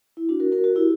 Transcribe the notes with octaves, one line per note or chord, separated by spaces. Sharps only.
E4
D4 F#4
F#4 A#4
F#4 A#4
F#4 A#4
E4 G4